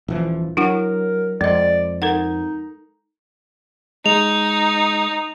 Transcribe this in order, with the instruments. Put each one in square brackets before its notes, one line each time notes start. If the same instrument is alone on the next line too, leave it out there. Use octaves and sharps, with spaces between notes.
[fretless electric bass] D#1 E3 F3
[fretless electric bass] F#3 [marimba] D4 E4 F#5 [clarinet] A#4
[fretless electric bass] F2 [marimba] G#3 D#5 [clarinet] D5
[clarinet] D#4 [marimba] A4 A#4 F#5
[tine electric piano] G#3 [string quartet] D#4 [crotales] F7